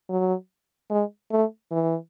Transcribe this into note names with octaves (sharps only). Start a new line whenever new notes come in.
F#3
G#3
A3
E3